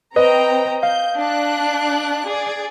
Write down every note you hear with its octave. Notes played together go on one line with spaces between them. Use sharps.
C4 B4 D#5 G5 A#5
F5 G6
D4 F#6
G#4 D5